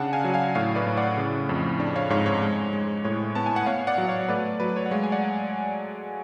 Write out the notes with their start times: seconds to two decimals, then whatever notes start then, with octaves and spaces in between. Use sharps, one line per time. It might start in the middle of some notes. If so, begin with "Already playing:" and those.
Already playing: C#3 D4 F#5 A5
0.13 F5 G#5
0.24 F#3
0.34 F5 G#5
0.55 A2 C#5 F5
0.75 B4 D5
0.87 A2
0.97 D5 F#5
1.17 C#3
1.49 F2
1.80 D4
1.96 C#5 F5
2.10 G#2 C#5 F5
2.26 C#5
2.42 G#3
2.73 G#3
3.05 A2 C#5
3.35 B3 A5
3.46 G#5
3.56 F#5
3.66 B3 C#5 F5
3.87 D5 F#5
3.98 F#3
4.08 C#5 F5
4.28 A3 B4 D5
4.60 F#3 B4
4.76 C#5
4.86 F#5
4.91 G#3 C#5 F5
5.03 G#5
5.12 D5 F#5